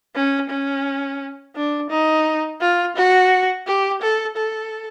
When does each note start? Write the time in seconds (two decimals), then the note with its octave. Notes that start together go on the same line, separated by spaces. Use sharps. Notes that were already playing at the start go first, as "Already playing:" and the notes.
0.14 C#4
0.50 C#4
1.55 D4
1.90 D#4
2.60 F4
2.96 F#4
3.66 G4
4.01 A4
4.36 A4